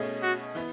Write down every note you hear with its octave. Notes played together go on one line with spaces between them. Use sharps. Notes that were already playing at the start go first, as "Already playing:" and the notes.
Already playing: B2 A3 C#4 G#4 D#5
F#4
E3 B3